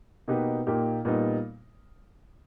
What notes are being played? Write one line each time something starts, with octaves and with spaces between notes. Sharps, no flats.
B2 A#3 D#4 G4 B4
A#2 A#3 D#4 G4
A#2 G3 B3 D#4